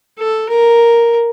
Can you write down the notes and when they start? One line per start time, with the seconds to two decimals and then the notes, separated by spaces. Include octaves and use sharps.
0.19 A4
0.50 A#4